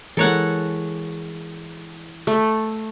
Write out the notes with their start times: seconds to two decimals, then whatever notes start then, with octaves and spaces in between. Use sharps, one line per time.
0.17 E3 G#3 A4 A#4 C#5 F#5
2.27 A3